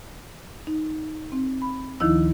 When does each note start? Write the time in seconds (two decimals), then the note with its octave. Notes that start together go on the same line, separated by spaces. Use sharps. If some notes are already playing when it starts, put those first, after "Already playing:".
0.67 D#4
1.32 C4
1.62 B5
2.00 D2 D#3 F3 D#4 E4 E6